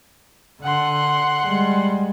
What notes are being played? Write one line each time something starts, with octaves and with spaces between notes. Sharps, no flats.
D3 F#5 C6
G3 G#3